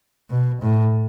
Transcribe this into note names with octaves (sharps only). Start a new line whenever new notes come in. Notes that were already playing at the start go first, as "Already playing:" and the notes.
B2
A2